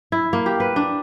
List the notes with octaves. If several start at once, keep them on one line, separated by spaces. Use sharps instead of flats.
E4
A#3
G4
B4
D4